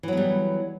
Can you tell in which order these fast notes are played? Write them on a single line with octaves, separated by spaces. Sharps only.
E3 F#3 B3 G3